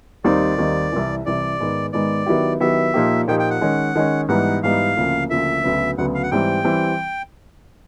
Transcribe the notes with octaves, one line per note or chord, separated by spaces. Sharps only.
D#2 D#3 G3 C4 D#4 D5
D#2 D#3 G3 C4 D#4
C2 C3 E3
C2 C3 E3 D5
G#2 D#3 G#3 B3
G#2 D#3 G#3 B3 D5
D#3 F#3 B3 E4 G4
D#3 F#3 B3 E4 G4 E5
A#2 F3 A#3 D#4 G4
A#2 F3 A#3 D#4 G4 G5
G5
F#5
D#3 G#3 C#4
D#3 G#3 C#4
G#2 E3 G3 B3 D#4 F#5
G#2 E3 G3 B3 D#4 F5
D2 C#3 F3 A#3
D2 C#3 F3 A#3 E5
D2 C#3 F#3 B3
D2 C#3 F#3 B3 F#5
F5
F#5
G#2 E3 G3 C4 G5
E3 G3 C4